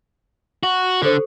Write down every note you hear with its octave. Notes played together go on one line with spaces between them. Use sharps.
F#4
D3 G4 A4 C5